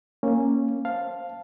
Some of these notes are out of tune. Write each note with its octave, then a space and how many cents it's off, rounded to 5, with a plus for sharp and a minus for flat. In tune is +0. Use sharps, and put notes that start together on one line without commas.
A#3 +0 C#4 -10
C5 +5 F5 +0 A5 +0